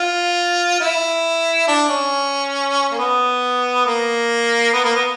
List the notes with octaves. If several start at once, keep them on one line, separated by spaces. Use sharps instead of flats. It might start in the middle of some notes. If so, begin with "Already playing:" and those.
Already playing: F4
E4
D4
C#4
A#3
B3
A#3
B3
A#3
B3